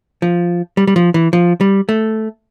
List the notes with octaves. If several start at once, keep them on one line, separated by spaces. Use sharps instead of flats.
F3
G3
G3
F3
E3
F3
G3
A3